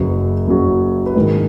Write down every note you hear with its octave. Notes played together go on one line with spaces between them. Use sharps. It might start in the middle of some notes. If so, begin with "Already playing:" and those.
Already playing: F#1 F#2 C#3 F#3 B4
F#1 F#2 C#3 F#3
B4
G#2 D#3 G#3 A#4